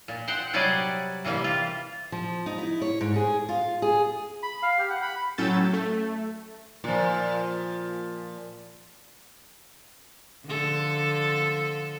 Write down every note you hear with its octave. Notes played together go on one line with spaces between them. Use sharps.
A#2
C5 F#5 G5
C3 F#3 G3 D5 F#5 G#5
C3 E3 G3 A#3
F4
F3
D#4
E4
C#5
G#2
G#4
F4
G#4
B5
F5
G4
F#5
B5
A2 F#3 C#4 E6 G6 A6
A3
A#2 F3
D3 F3 A4